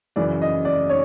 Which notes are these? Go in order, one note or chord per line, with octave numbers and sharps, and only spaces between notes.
F#2 C#3 E3 D5
D#5
D5
C#5